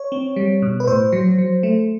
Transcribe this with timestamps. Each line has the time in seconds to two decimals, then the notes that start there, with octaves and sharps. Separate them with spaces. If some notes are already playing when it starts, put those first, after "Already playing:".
Already playing: C#5
0.12 C4
0.36 G3
0.62 B2
0.80 B4
0.87 A2 C5
1.12 F#3
1.38 F#3
1.63 A3